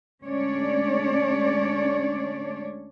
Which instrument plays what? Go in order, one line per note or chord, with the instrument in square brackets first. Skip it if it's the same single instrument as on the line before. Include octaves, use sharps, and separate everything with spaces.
[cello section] D2 G#3 C#4 D4 C#5 D5